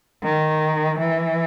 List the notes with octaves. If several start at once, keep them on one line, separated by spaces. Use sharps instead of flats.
D#3
E3